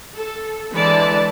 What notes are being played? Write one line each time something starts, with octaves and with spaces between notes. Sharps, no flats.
A4
D3 E3 G#3 B4 D5 A5